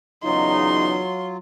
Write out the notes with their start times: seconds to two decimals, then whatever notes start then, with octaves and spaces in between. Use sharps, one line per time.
0.24 E2 C#3 F#3 D#4 F4 C6